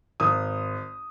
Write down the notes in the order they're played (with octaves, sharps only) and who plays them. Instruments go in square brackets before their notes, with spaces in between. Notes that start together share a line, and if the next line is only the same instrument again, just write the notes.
[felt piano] G#1 D#6